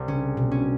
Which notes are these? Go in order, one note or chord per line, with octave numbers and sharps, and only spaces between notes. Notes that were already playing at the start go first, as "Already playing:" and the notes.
Already playing: C2
C#3 C#4
B2
C#4